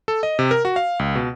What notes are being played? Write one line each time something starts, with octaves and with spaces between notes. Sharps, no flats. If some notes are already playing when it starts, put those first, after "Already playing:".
A4
D#5
C3
A#4
F#4
F5
C#2
B2